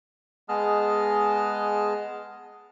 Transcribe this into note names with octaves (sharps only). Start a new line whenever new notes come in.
G#3 B3 G#4 D#5 A5 F6